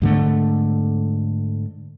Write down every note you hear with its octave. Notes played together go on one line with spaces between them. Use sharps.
G#2 D3 A3